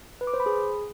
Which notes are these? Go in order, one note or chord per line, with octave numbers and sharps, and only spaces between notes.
B4
D6
C5
B5
G#4